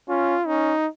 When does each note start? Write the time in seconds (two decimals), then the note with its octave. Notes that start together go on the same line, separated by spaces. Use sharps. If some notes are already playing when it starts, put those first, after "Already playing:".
0.09 C#4 F4
0.47 C#4 D#4